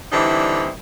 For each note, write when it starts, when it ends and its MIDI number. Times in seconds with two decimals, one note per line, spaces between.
0.12 0.70 50
0.12 0.70 52
0.12 0.70 55
0.12 0.70 60
0.12 0.70 63
0.12 0.70 64